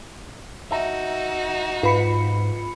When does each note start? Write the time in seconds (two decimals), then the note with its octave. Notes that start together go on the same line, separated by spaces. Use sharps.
0.71 D#4 F#4 E5 A#5
1.83 G#2 F4 B4 B5 C#7